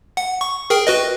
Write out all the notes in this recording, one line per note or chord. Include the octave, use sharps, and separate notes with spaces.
F#5
C#6
G#4 A#4 G5
F#4 B4 D#5